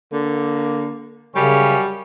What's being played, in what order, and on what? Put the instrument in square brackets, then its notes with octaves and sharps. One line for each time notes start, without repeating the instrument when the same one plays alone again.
[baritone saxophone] D3 [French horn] A#3
[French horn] F#2 [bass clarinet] C#3 [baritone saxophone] G3 [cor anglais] C#4